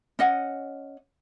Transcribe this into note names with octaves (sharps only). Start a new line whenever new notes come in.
C#4 D#5 F#5